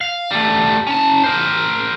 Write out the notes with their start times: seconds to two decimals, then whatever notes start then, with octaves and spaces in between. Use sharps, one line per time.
0.01 F5
0.31 G3 A3
0.87 C#4 A5
1.24 A#4 C5